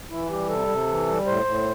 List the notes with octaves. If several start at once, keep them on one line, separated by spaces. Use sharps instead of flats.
E3 E4
G3 G4
C3 A4
C3
E3
G3
A2 C5
A2